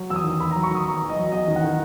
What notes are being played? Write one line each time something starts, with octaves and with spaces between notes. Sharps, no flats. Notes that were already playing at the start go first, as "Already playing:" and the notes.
Already playing: F#3
E2 E6
D#6
D#3
E2 B5
A#5
F#3
C#6
D#3 D#6
E2 A#5
E2
D#5
F#3
E2 D#5
D#3
F#5
D#3